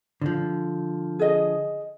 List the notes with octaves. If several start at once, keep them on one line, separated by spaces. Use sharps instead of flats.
D3 F3
G#4 D#5